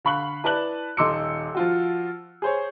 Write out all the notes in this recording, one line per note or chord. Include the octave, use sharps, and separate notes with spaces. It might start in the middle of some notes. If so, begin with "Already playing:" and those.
D3 F5 B5 C#6 F#6 F#7
E4 B4 D5 A5 F#6 F#7
D#1 D#4 C6 D6 E6 C#7
F3 F4 F#4
G#4 C5 C#5